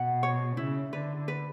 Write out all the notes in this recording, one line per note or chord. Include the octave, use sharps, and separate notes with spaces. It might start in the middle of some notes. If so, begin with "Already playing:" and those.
Already playing: B2 F#5
C#5
C#3 E4
D3 B4
B4